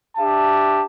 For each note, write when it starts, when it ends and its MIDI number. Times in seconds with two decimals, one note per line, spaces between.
0.18 0.82 62
0.18 0.82 67
0.18 0.82 76
0.18 0.82 81